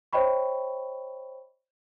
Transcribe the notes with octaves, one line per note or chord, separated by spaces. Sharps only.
C5 C#5 D#5 G5 B5 C#6